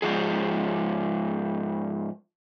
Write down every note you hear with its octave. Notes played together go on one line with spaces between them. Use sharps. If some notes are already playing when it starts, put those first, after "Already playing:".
G#2 B2 F3 G#4